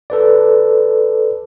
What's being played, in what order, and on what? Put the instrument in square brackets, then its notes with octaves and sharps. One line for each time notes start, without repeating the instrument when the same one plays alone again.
[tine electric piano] A4 B4 D5